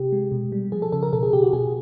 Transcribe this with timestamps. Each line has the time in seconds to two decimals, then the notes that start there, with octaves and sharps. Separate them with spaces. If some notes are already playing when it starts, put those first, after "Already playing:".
Already playing: C3 G4
0.12 G#3
0.32 B2
0.52 G3
0.72 F3 G#4
0.82 A4
0.92 C#3 A4
1.03 A#4
1.13 B2 A4
1.23 G#4
1.33 B2 G4
1.43 F#4
1.53 B2 G#4